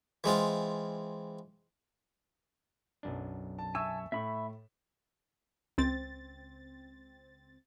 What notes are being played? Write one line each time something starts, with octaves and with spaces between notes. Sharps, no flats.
E3 G#3 C4 F4
B1 F#2 D4
A5
E5 G#5 A5 C#6 E6
A2 E5 B5 C#6
C#2 C4 A6